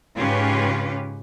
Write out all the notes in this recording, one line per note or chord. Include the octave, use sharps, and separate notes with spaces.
G#2 C#3 C#4 F4 G4 B4